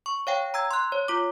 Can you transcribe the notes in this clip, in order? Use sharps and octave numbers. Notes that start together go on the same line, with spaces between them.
C#6
C#5 F5 G5
A#5 E6 G#6
C6 F#6
C#5
F4 D6